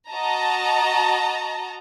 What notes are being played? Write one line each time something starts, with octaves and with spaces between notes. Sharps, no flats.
F#4 D#5 A5 A#5